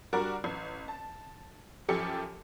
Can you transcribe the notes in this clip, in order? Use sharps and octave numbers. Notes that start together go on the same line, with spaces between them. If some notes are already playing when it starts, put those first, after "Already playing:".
G3 D4 F#4 A#4 D5
A1
A5
F#2 F3 G4 A4 G#5 C#7